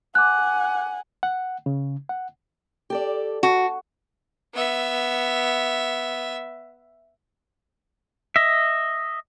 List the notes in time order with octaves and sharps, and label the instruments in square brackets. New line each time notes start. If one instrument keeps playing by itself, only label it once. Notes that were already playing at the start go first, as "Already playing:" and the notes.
[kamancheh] F#5 G#5 [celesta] D6 F#6
[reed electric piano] F#5
C#3
F#5
[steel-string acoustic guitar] G4 A4 D5
[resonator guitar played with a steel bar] F#4 [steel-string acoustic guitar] A5
[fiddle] B3 E5
[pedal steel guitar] D#5 E5